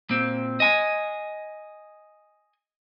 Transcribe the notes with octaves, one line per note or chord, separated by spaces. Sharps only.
A#2 C4
D#5 G#5